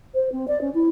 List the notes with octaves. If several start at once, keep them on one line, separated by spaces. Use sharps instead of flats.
C5
C4
D5
C#4
E4